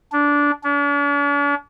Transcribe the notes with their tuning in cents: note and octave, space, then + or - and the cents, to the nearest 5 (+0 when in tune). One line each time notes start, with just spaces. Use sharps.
D4 -15
D4 -45